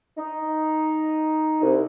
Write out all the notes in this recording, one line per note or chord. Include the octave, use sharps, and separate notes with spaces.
D#4
C2